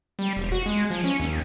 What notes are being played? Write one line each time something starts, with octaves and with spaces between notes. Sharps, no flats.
G3
E1
F#4
G#3
F3
C#4
D#2